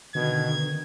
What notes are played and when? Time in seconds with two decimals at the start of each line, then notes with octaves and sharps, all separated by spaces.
0.15 B2 D3 D#3 G#6